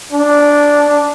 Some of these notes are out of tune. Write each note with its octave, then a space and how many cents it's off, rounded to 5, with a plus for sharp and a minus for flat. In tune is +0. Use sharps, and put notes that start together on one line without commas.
D4 -5